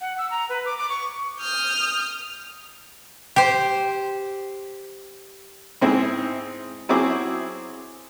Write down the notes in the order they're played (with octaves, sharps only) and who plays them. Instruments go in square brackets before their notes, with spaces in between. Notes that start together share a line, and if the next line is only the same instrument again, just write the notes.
[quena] F#5
E6
A#5
B4
D6
D6
C#6
[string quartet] D#6 F6 G6
[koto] G4 C5
[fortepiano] G#2 C4 E4 G#4
F#3 C4 E4 G#4 D6